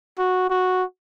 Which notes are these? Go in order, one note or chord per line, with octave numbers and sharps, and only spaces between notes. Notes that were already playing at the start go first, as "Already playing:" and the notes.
F#4
F#4